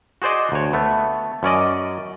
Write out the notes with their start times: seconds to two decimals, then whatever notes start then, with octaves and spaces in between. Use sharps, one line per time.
0.22 F#4 G#4 C5 D5 D#5
0.52 D2 C#5
0.73 A3 B3
1.43 F#2 C#4 D5 D#5